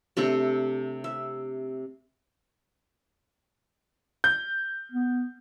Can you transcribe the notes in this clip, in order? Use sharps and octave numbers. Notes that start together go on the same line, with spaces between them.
C3 A3 D4 A4
E5
G6
B3